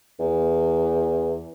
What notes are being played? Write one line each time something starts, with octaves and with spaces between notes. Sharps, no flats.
E2